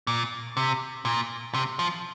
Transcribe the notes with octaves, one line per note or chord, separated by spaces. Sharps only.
A#2
C3
A#2
C3
F3